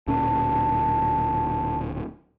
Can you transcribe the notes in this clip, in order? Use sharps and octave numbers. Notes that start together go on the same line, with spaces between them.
D1 A#2 C#4 A5